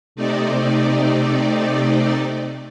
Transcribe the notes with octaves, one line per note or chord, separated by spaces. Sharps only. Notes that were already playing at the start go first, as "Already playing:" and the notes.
C3 A3 C4 D#4 D5